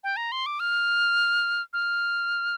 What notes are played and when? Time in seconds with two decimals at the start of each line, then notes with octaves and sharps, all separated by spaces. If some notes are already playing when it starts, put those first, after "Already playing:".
0.04 G5
0.17 A#5
0.32 C6
0.46 D6
0.60 F6
1.73 F6